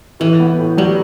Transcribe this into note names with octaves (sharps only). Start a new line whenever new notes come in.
A2 E3
B3
A2
F#3 G3